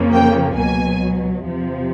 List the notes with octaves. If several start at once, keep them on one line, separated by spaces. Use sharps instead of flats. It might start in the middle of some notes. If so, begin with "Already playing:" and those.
Already playing: F2 C#3 F3 A#3
G5
C#2 B2 F#3 G#5
E2 C3 F3